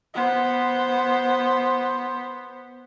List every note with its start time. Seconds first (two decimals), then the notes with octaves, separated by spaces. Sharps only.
0.14 B3 C5